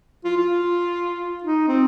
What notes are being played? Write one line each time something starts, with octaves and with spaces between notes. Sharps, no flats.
F4
F4
D#4
C4